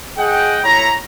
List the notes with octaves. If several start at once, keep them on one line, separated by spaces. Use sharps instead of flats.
G#4 D#5 F#5 G5
A2 E4 C#5 A#5